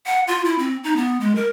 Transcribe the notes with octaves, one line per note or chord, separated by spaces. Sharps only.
F#5
F4
E4
C4
D#4
B3
G#3
A#4